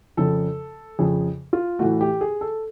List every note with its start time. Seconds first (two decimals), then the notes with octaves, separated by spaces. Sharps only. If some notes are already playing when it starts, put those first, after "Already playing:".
0.17 F2 C#3 F3 A4
0.99 F2 C#3 F3 G#4
1.53 F4
1.79 A2 E3 A3 F#4
2.01 G4
2.21 G#4
2.41 A4